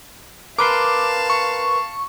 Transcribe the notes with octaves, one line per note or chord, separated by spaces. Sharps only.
A#4 B4 F5 A5 C6 D6
C#6